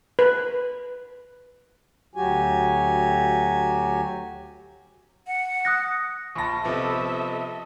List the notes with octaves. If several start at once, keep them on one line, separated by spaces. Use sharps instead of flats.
B4
D2 F#3 F#4 G4 G#5
F#5
D#6 F#6 A#6
A#1 F4 A5 B5 C#6 A#6
C3 F3 B3 A4 D#5 E5